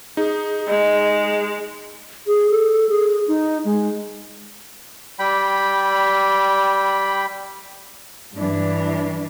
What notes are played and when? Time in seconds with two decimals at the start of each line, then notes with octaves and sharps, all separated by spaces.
0.17 D#4 G#4
0.68 G#3 D#5
1.09 G#4
2.27 G#4
2.51 A4
2.89 G#4
3.28 D#4
3.65 G#3
5.19 G3 G5 B5
8.36 G2 E3 D4